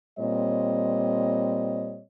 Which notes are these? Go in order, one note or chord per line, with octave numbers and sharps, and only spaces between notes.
A#2 G3 C4 C#5 D#5